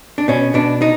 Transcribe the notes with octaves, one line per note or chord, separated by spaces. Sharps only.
D4
B2 C#4
B2 D4
D#4